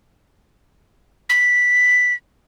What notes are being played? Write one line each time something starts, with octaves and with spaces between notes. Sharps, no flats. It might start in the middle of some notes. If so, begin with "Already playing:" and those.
B6